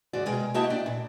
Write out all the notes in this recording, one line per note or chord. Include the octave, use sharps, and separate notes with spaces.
D#2 G#2 F#4 D5
B2 G#3 G#4 A#4 G5
A#3 E4 F#4 G4 D#5 A5
A3 D4 G5
A#2